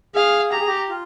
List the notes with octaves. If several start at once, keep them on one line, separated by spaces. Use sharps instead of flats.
G#4 F5
G4 A#5
G#4
G4
F4